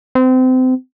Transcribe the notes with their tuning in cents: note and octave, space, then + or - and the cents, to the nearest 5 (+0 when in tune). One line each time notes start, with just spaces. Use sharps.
C4 -30